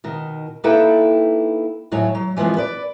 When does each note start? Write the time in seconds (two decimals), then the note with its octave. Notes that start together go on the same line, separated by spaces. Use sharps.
0.04 B2 D#3
0.64 A#3 D#4 E4 A4 B4 G5
1.91 D#2 A2 F#3 C#5 G#5
2.15 F#3
2.37 E3 F3 G#3 B3 C4
2.57 B4 D5